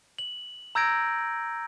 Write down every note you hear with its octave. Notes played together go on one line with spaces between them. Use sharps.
F#7
A#5 E6 G6 G#6 A#6 D7